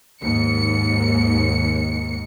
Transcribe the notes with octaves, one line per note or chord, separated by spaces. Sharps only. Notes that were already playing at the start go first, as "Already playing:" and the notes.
D#2 G#2 C#7